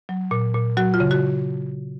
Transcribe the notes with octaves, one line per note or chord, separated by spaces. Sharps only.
F#3
A#2
A#2
F#3 F#4
F4
C#3
F#4